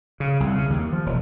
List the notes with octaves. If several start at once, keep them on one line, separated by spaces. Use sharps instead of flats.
C#3
C2
C#3
D#2
F3
E1